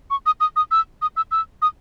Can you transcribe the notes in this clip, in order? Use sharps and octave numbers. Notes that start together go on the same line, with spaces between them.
C#6
D#6
D#6
D#6
E6
D#6
E6
E6
D#6